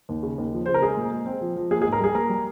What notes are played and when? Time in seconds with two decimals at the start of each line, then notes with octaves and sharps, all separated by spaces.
0.09 D#2
0.23 C#3
0.38 D#2
0.53 F3
0.66 C#3 C5
0.74 A#4
0.82 G#3 G#4
0.97 A#2
1.11 G#3
1.26 C4
1.41 F3
1.56 F3
1.71 A#3 G#4
1.82 G#4
1.86 G#2
1.93 A#4
2.00 G3 G#4
2.15 A#3 A#4
2.30 G3